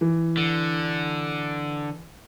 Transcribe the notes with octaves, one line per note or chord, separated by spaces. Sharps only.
E3
D3